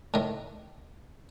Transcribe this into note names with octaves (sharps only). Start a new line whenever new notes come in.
A2 D#3